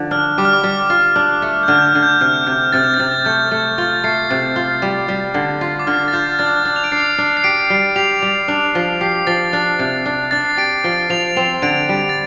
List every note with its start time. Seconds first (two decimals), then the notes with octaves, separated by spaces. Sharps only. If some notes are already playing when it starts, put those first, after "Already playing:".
Already playing: D3 F3
0.11 D4 F6
0.38 G3 D6
0.45 F6
0.53 D6
0.64 G3
0.90 F4
1.16 D4
1.42 A3
1.63 G6
1.68 D3 F6
1.78 G6
1.86 F6
1.95 D3
2.03 G6
2.21 C3 F6
2.47 C3 G6
2.72 C3 A6
2.84 G6
2.94 A6
3.00 C3
3.25 A3 G6
3.51 A3
3.78 F4 A6
4.04 A3 C7
4.29 C3 A6
4.56 F4
4.82 G3
5.08 G3
5.34 D3
5.61 F4
5.79 D6
5.87 D3 F6
6.08 A6
6.13 F4 G6
6.39 D4 A6
6.65 D4
6.76 F7
6.84 D7
6.92 D4 C7
7.18 D4
7.37 C7
7.44 G4 D7
7.70 G3
7.96 G4 F7
8.22 G3
8.48 D4
8.75 F3
9.01 G4 C7
9.27 F3 A6
9.53 D4
9.79 C3
10.06 D4
10.31 D4 A6
10.44 C7
10.57 G4 D7
10.84 F3
11.10 F3 F7
11.37 C4
11.62 D3 D7
11.89 G3
12.09 A6